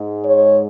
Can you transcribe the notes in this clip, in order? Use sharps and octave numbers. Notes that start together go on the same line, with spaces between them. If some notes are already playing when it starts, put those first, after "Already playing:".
Already playing: G#2 G#3
C#5